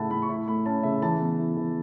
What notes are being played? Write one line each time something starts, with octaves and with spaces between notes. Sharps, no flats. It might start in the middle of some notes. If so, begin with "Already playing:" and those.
Already playing: A2 C#3 A3 E4 F#5 A5
A2 B5
C#6
E4 B5
A3 B5
C#4 A5
C#3 E5
E3 A5
B3
E4
E3